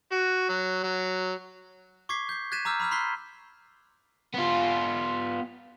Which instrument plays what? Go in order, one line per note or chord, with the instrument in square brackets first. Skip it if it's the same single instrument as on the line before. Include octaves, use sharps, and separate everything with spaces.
[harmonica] F#4
F#3
F#3
[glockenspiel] C#6 D6 G#6 B6 C7
G6 C7
F#6 G#6 A6 B6 D#7 E7
A#5 D6 E6 F6 G6
B5 D6 E6 F6 G6
B5 C6 F#6 B6 C7 G7
[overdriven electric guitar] B3 F4